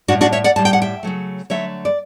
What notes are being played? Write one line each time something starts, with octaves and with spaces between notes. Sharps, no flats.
A2 G3 D4 F#4
D4 F#4
C#5 E5
D5 F#5
A2 G3 A5
G5
F#5
E5 G5
C#3 F#3 A3
D3 F#3 A3 C#5 E5
D5